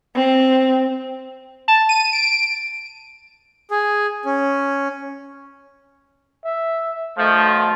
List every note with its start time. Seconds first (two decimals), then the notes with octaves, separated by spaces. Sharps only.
0.15 C4
1.68 A5
1.89 D#7
2.13 D7
3.71 G#4
4.25 C#4
6.44 E5
7.18 B1 D#3 F3 A3